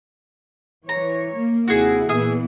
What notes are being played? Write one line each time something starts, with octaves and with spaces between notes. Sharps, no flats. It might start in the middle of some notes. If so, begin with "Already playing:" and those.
E3 C#5 A#5
A#3
D#2 C3 E4 F#4 G#4
A#2 E3 B3 G#4 E5 D#6